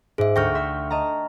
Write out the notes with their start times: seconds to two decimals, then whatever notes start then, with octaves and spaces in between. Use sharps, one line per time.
0.18 G#2 G#4 E5
0.36 D2 G5 C#6 F6 G6 A#6
0.55 E5 C6
0.90 D#5 A5 A#5